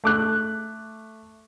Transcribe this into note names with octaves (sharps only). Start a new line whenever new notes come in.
A3 D6 F#6